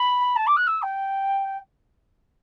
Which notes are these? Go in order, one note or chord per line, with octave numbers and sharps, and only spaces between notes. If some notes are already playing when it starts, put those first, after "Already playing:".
Already playing: B5
A5
D6
F#6
E6
G5